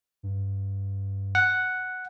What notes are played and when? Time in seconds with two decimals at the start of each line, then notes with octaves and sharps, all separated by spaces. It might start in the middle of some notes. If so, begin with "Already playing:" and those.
0.23 G2
1.35 F#5